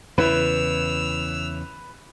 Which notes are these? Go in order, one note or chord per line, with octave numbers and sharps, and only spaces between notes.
E2 C#3 E4 B4 E6 F7